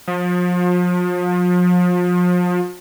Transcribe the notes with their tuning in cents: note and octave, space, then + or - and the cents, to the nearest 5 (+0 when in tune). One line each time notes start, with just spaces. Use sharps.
F3 +35